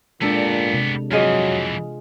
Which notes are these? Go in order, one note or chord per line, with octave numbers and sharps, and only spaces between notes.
A#2 G#3 B3 D4 G4 A4
C3 G#3
F2 E3 F#3 F4 G#4 D#5